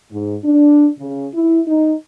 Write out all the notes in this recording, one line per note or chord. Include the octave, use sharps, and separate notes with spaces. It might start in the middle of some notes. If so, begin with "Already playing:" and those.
G#2
D4
C#3
E4
D#4